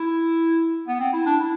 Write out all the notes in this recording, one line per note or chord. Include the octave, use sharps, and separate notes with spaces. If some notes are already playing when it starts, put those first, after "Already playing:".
Already playing: E4
B3
C4
E4
D4
E4